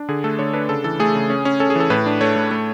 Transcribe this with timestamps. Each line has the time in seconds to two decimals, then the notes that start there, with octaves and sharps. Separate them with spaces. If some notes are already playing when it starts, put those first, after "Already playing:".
Already playing: D4
0.09 D3 G#4
0.24 A3 A4
0.39 D3 C#5
0.53 D4 B4
0.69 C#3 A4
0.84 E3 A4
1.00 A3 G#4
1.15 C#3
1.30 C#4
1.45 C#4
1.60 C#4 A4
1.70 G#4
1.75 E3 A4
1.90 A2 B4
2.06 D4
2.21 A3 C#5
2.36 A2
2.51 A3